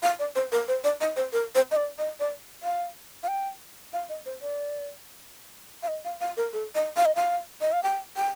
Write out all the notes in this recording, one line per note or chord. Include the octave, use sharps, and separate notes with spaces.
F5
D5
C5
A#4
C5
D5
D#5
C5
A#4
C5
D#5
D5
D#5
D5
F5
F5
G5
F5
D#5
C5
D5
F5
D#5
F5
F5
A#4
A4
D#5
F5
D#5
F5
D#5
F5
G5
G5